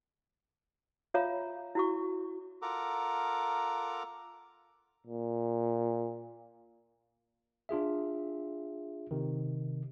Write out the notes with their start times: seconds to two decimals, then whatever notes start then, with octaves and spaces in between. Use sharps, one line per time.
1.14 F4 C#5 E5 F5 A#5
1.75 E4 F#4 C#6
2.62 F4 A4 A#4 F#5 A#5 D6
5.07 A#2
7.69 D4 F4 G#4 E5
9.11 C3 D#3